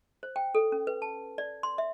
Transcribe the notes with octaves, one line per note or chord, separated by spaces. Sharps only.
C5
G5
A4
C#4
B4
A5
D5
C6
E5